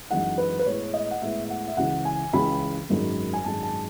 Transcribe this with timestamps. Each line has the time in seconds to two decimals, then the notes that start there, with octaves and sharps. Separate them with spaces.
0.11 F#2 E3 G#3 D#4 F#5
0.38 B4
0.59 B4
0.66 A2 G#3 B3 E4 C#5
0.94 D#5
1.11 F#5
1.22 A2 G#3 B3 E4 E5
1.45 E5
1.50 F#5
1.68 E5
1.77 C#2 C#3 E3 F#5
2.05 G#5
2.33 C#2 C#3 E3 B5
2.89 G#1 F#2 D#3 G#3
3.33 G#5
3.44 G#1 F#2 D#3 G#3 A5
3.63 A5